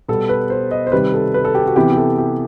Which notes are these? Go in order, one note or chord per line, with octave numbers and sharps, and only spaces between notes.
B2 G3 B3 A4
B4
C5
D#5
C5
C3 D#3 G3 B4
A4
B4
A4
G4
F#4
C3 E3 B3 G4
G4
A4
G4